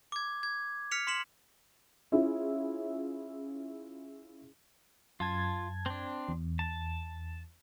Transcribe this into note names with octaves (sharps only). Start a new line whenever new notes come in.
D6 G#6
G#6
F6 B6 C#7 F7
C6 B6 C#7 E7 F#7
C#4 E4 F4 G#4
F#2 F4 A5 G#6
C4 D4
E2
A5